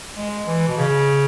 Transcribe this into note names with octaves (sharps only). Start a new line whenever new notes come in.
G#3
E3
B2
C#3